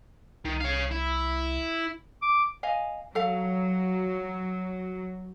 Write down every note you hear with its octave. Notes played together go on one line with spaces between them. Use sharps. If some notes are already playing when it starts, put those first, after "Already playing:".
C2 D#3
C#5 F5
E4
D6
D#5 F5 G#5
F#3 A4 F5